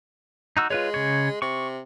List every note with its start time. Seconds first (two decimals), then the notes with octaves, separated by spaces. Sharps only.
0.57 D#4 F#4 E6
0.70 G#3 F4 B4 C#5
0.94 C#3 C#5
1.42 C3 C#6